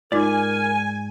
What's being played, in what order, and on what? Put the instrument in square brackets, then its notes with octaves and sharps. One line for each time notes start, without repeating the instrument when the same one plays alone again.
[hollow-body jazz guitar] G#2 D5 [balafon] D#4 F4 [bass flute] A#4 [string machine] G#5